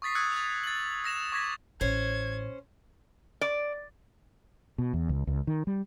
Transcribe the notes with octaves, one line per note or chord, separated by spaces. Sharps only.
C#6 D#6 A6 B6 C7
D#6 E6 F#6 G#6 C#7
A6 F7
A6 F#7
E6 A#6 E7 F7
C#6 D6 G#6 A#6 B6
A1 C#4 C5 G#6
D5
B2
E2
C#2
C#2
D#3
G3